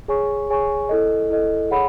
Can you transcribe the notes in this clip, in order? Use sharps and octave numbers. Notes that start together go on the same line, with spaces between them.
G#4 C#5 G#5 C#6
G#4 C#5 G#5 C#6
E4 A4 D#5
E4 A4 D#5
G#4 C#5 F#5 B5